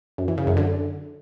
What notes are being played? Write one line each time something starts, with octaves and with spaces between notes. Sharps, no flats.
F#2
E3
C#3
F#2
D3